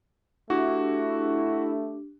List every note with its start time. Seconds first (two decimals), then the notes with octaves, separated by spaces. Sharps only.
0.50 A3 D4 E4 F#4 G4